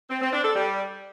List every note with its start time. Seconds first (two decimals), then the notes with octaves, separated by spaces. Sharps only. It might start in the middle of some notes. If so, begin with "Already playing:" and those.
0.10 C4
0.21 C4
0.33 D4
0.44 A4
0.55 G3